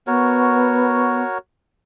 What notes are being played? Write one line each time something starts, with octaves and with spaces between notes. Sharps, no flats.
B3 F#4 A#4 C#5